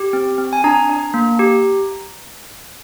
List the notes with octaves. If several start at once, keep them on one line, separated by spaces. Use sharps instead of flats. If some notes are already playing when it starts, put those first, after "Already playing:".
Already playing: G4
C4
C4
G#5
D4 A#5
D4
A#3
G4